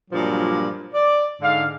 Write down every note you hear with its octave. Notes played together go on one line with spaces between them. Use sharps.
G2 A#2 F3 F#3 A#3
D5
G#2 D3 F5